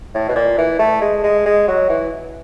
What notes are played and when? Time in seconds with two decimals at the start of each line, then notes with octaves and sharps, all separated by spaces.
0.14 A2
0.29 B2
0.36 A#2
0.58 E3
0.79 A3
1.01 G#3
1.23 G#3
1.46 G#3
1.68 F#3
1.90 E3